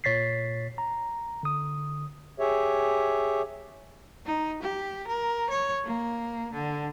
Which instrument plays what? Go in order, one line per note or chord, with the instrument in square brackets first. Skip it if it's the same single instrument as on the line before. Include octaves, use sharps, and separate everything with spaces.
[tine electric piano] A#2 C#5 A6 B6 C7
A#5
D3 D#6
[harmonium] G4 G#4 C#5 E5
[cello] D#4
G4
A#4
C#5
A#3
D3